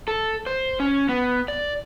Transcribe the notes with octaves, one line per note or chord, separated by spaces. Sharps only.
A4
C5
C#4
B3
D5